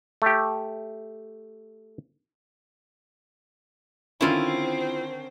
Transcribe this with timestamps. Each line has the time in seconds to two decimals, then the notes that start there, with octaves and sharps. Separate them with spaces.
0.22 A3 G4
4.21 D3 D#3 C4 C#4 E4 F4 C5